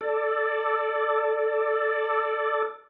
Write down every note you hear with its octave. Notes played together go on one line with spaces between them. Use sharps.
A4 D5